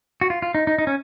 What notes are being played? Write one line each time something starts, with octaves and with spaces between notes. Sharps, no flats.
F#4
F4
F4
D#4
D#4
D#4
C#4